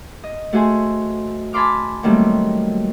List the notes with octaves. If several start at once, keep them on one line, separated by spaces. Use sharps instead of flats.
D#5
A3 F#4 G#4 C5 G#5
G#5 A5 B5 C6 D6 F6
D#3 F#3 G3 A3 A#3 C4